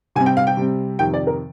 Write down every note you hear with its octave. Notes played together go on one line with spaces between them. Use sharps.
C3 G3 C4 G#5
G5
F5
G5
C3 G3 C4
F2 C3 D#3 G5
D5
A#4